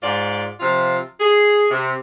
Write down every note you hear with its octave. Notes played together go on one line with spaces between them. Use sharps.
G#2 F4 D5
C3 F3 F4
G#4
C3